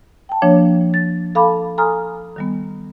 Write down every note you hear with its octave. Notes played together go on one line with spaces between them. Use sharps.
G5 A5
F3 A#3 D4 C#5
A6
A4 F5 A5 B5 D6
A4 G#5 A#5 C6 D#6 F6
D#3 G3 B3